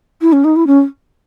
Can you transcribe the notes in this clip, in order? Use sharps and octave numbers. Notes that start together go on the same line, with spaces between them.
E4
C#4
D#4
E4
C#4